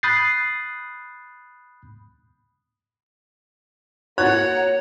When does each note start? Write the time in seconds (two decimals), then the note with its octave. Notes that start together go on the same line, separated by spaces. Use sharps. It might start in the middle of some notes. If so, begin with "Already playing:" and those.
0.03 B5 D#6 F#6 G6 A6 C7
4.18 A#3 F#4 C#5 F#5 A#5 F#6 A6